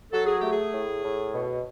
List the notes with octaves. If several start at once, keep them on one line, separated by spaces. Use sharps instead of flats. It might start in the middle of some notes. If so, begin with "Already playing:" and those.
F#3 A4
G#4
A3 G4
G#4
A2
A2
B2